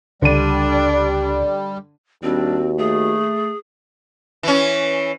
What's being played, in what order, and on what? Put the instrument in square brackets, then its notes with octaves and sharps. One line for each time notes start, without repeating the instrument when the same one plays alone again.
[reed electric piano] C#2 [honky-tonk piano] D3 D#7 [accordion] G3 [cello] D4
[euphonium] D#2 [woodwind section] G3 D4 [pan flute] C4 [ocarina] F#4
[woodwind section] A3 [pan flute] G#4
[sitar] E3 C#4